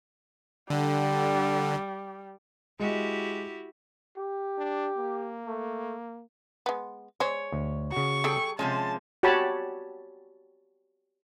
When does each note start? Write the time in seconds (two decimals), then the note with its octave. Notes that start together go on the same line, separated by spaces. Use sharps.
0.70 D3 G3
2.80 G#3 E4 F#4 G4
4.17 G4
4.58 D4
4.98 A#3
5.46 A3
6.66 G#3 B3
7.20 G#3 G#4 C5 C#5
7.52 D2
7.92 C#3 F#4 C#6
8.24 G3 G#4 A4 G5
8.59 C3 F3 G#3 C#4 A5
9.23 F#4 G4 C#5 A5 B5